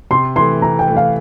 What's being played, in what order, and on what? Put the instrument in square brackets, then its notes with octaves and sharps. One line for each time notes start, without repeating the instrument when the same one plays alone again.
[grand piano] C3 [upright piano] C6
[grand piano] E3 A3 [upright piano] C6
[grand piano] C3 [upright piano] A#5
[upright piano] G5
[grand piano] E3 A3
[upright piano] F5